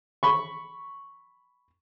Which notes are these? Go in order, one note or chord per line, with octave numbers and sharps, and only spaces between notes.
B5 C#6